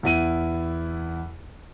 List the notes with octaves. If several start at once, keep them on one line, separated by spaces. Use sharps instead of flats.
E2 E4 D#7